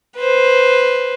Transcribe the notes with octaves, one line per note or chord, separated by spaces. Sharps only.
B4 C5